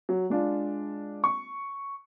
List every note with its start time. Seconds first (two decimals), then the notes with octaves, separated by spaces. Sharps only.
0.09 F#3
0.30 G#3 D4 F4
1.24 C#6